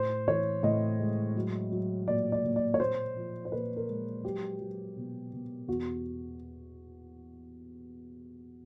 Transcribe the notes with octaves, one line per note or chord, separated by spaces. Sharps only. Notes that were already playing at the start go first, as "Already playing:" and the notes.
Already playing: A2 C5
E3 C#5
A2 D#5
G#3
F#3
F#3
A#2 D5
D5
A#2
D5
C#5
A#2 C5
F3
C5
A#2 B4
A#4
G#3
F#3 G4
F#3
B2
B2
E2 F#4